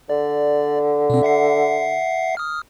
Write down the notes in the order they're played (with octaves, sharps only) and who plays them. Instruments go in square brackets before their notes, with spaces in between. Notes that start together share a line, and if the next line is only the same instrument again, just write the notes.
[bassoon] D3 [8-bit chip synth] D5
[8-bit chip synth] B2 C4
E5 F#5 C7
D#6 F6